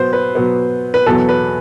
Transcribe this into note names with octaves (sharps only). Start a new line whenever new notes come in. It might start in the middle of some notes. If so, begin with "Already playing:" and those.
Already playing: B2 F#3 B3 C5
B4
B2 F#3 B3
B4
E2 B2 F#3 B3 A4
B4